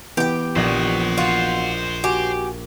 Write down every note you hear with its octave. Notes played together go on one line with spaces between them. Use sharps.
E3 B3 G4 G5
A#1 A#2 C5 D#5 F#5
F4 F#4
F#4 G4 G#5